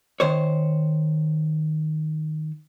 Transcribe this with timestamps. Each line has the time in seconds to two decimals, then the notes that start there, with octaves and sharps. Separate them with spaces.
0.20 D#3 C5 C#5